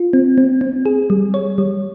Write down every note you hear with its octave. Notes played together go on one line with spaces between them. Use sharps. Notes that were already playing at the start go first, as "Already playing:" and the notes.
Already playing: F4
C4
C4
C4
G#4
G3
C#5
G3